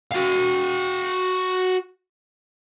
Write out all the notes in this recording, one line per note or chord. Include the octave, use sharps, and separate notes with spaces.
F#4 F5